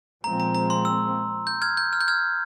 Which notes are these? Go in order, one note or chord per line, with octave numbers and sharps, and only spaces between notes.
A#2 F3 G#3 C4 A#5
A#5
A#5
C6
E6
G6
F6 G#6
G6
F6
G6
F6 G#6